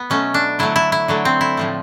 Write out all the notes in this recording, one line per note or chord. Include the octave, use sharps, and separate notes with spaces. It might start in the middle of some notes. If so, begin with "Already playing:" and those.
Already playing: B3
B2 F#3 A3 C#4
D4
D3 F#3 A3 E4
E4
E4
D3 F#3 A3
C4
E4
A2 F3 A3